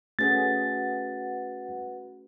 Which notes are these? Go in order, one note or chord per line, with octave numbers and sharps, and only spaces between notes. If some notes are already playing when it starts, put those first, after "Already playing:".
A3 C#4 F#4 G#4 B4 F#5 A6